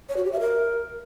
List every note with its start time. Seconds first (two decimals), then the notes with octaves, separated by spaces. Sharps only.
0.09 C#5
0.17 F#4
0.24 G4
0.32 E5
0.40 A#4